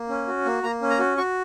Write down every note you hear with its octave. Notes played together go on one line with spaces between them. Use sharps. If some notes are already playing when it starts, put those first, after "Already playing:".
Already playing: A#3
C#4
F#4
A#3
A#3 A#5
C#4
A#5
F#4
F#4 C#6